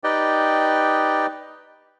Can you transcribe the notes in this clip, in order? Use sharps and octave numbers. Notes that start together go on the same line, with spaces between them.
D#4 G4 B4 D5 D#5 G5